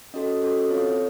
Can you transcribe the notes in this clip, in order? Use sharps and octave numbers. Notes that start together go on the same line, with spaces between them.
C#4 F#4 A4 D#5
C#4 F#4 A4
C4 F4 A4 C#5